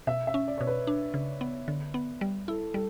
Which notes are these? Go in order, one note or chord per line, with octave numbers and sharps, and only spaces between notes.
B2 E5
E5
C#4
D5
B2 C#5
B4
D4
C#3
B3
D3
B3
G3
E4 A4
G3 A4